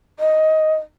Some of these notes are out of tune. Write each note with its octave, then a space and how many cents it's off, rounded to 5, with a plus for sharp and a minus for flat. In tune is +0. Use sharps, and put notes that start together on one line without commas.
D#5 +5